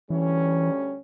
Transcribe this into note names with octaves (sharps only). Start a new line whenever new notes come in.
D2 E3 G3 C#4